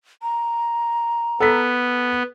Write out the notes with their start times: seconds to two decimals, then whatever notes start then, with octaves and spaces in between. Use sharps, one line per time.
0.22 A#5
1.40 B3 A4 B6